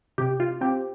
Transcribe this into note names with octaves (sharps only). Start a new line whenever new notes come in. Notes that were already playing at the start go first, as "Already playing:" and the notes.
C3 G4
F4
C4 G4